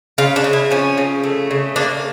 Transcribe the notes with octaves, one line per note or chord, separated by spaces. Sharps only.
C#3 F4
D4
C#3
E4
F3 C#4
C#3
A3
C#3
A#3 D4